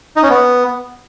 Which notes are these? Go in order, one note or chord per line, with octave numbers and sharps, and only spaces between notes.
D#4
C#4
B3